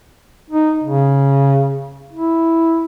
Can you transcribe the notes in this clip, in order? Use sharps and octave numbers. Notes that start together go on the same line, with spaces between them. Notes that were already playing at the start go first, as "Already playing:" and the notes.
D#4
C#3
E4